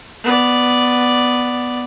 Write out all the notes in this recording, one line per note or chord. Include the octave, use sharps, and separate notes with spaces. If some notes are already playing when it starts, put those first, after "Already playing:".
B3 D5